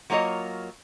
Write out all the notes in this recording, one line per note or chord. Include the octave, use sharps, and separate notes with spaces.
F#3 A#3 F4 C#5 D#5